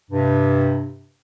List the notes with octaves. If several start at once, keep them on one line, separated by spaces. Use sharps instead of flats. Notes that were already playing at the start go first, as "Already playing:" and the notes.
G2 C3